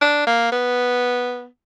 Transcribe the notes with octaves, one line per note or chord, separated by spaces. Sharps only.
D4
A#3
B3